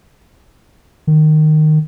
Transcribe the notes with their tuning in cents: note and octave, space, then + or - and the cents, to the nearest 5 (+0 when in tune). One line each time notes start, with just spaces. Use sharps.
D#3 -15